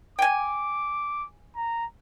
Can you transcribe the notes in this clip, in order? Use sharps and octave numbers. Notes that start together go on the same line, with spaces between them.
G5 G#5 D6
A#5